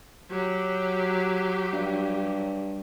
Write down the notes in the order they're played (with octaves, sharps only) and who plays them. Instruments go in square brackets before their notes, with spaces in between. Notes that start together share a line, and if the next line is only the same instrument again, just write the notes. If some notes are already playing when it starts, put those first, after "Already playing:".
[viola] F#3 G4
[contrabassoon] G2